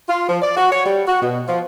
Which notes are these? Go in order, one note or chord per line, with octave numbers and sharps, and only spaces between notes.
F4
F3
D5
F#4
C#5
G3
F#4
B2
F3